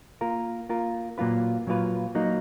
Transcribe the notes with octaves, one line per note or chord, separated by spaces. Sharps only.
A#3 F4 A#4
A#3 F4 A#4
A#2 F#3 A#3 F4 B4
A#2 F#3 A#3 F4 B4
F#3 A#3 D#4